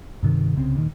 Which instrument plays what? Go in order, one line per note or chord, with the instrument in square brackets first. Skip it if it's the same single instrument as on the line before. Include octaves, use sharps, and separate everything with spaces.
[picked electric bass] G2 C3 D#3
C2 C#3 C4
D#1 D#2 D#3